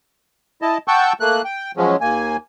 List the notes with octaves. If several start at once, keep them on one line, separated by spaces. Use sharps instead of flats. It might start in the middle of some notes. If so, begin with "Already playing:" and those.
E4 D#5 A5
F#5 G5 A5 C#6 E6 G6
A3 A#3 F#6
G5
F3 F#3 G#3 C#4
D#2 A#3 G#5